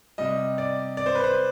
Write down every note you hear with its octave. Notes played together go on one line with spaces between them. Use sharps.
C3 G3 D#5
D5
D5
C5
B4
C5